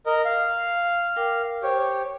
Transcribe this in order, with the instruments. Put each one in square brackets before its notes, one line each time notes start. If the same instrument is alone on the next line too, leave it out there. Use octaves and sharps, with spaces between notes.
[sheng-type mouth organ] A#4 D#5
F5
[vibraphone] A#4 G5 D6
[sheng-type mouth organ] G4 C#5 [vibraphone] C5